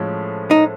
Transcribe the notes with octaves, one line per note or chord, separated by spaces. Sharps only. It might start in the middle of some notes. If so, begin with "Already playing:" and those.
Already playing: A2 F3 G#3 C#4
D#4